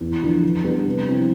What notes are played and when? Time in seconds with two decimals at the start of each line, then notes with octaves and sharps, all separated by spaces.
0.01 E2
0.22 D3 F3 B3 D4
0.43 D3
0.64 G3 B3 D4
0.87 C3
1.08 F3 C4 E4